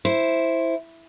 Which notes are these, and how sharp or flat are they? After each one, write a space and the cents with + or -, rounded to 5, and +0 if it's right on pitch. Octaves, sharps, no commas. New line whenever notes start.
E4 +0 C5 +0